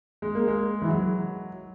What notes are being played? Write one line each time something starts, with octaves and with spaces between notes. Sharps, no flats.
G#3
A#3
G#3
E3
F#3